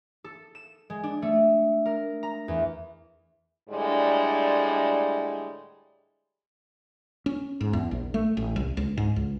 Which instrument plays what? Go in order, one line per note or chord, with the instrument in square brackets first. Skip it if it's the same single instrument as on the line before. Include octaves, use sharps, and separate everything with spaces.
[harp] A4
E7
G#3
D4
A3
A#4
A#5
E2
[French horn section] A2 D3 G3 G#3
[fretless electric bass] C#4
G#2
E2
A#1
A3
A1
C2
C#2
G#2
C#2